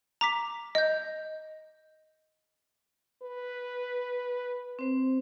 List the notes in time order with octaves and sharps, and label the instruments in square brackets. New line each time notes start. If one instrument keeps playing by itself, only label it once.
[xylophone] A#5 D6 B6
D#5 G6
[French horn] B4
[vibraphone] C4 C5